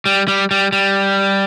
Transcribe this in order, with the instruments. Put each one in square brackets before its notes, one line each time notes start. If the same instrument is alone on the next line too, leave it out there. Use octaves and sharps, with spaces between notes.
[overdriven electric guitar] G3
G3
G3
G3